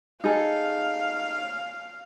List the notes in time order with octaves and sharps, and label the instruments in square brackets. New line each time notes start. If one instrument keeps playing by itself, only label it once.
[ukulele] D#4 G#4 A4 [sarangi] F5